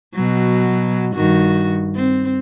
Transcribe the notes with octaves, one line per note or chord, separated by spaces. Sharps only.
B2 F#3
G2 D#3 F#4
C4